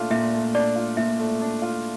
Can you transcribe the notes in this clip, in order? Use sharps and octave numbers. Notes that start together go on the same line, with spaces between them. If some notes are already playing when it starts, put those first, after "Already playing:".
Already playing: A#2 A3 D4 F4
A#2 E5
A3
D4 D5
F4
A#2 E5
A3
D4
F4